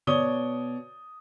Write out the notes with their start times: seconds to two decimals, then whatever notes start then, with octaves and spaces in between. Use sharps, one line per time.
0.07 B2 C#5 D5 D#6 G7